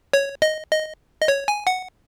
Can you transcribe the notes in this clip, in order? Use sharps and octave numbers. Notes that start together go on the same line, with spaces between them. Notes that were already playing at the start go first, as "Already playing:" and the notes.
C#5
D#5
D#5
D#5
C#5
G#5
F#5